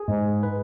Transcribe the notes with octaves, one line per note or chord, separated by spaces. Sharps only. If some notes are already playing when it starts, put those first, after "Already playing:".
Already playing: G#4
G#2 G#3
B4